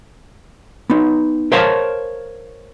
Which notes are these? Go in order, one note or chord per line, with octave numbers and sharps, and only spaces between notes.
B3 D#4
A#4 C5 C#5 F5 A5